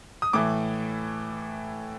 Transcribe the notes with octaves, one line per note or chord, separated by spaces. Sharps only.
D#6
A2 E3 A3 D6